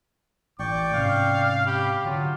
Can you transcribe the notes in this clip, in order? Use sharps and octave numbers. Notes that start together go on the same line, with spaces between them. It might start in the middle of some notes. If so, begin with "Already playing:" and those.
A1 D5 G5 C#6 D6
G#2 C3 C#4 F5
G4 B5
D3 F#3 F4